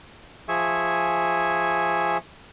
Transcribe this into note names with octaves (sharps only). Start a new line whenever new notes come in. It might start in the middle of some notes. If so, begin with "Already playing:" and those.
F3 G#4 E5 G#5 C#6